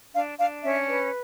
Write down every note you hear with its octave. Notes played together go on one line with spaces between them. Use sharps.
D4 F5
D4 F5
C#4 E5
B4